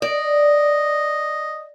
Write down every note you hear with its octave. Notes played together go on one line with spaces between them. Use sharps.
D5 D#5